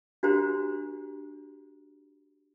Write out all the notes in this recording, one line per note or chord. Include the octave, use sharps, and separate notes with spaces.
D4 F#4 G4 C5 A#5